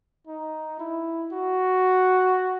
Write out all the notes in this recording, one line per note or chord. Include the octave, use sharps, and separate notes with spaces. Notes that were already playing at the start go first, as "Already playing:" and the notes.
D#4
E4
F#4